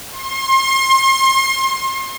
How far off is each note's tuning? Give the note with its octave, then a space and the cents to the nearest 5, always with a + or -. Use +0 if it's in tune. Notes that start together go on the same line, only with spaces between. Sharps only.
C6 +35